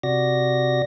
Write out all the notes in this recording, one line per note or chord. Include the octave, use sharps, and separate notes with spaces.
C3 F#4 D5 A#6